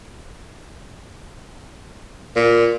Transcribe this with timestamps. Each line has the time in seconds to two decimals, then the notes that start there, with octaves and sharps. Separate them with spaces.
2.36 A#2